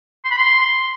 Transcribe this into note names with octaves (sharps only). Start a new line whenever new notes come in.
C6
B5
C6